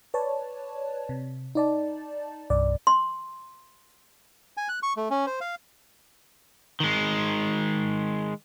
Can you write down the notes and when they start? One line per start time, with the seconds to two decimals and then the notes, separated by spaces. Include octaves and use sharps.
0.14 B4 C#5 D5 A5
1.09 C3
1.55 D#4 D5 A5
2.50 C2 G2 D5
2.87 C6
4.57 G#5
4.69 F#6
4.83 C#6
4.97 A3
5.10 C#4
5.27 C5
5.41 F5
6.80 D#3 G#3